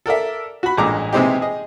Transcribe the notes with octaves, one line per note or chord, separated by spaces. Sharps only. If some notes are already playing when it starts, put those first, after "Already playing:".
A4 A#4 D5 E5
F#4 B5
A1 G2 A#2 G#3 A#5 D6
C3 E3 G#3 C4 D#4 G4
G#4 D#5